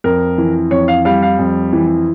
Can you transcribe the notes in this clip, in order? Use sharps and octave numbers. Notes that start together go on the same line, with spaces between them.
F2 A#4
E3
F2 C#5
F5
G3 F5
F5
F2
E3